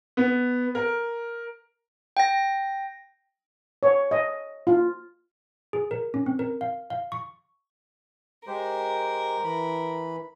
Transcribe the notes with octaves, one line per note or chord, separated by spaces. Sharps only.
B3
A#4
G5 A#6
C#5
D#5
F4
G#4
A#4
C#4
C4
A#4
F5
F5
C#6
G#3 G4 A#4 C5
E3 B5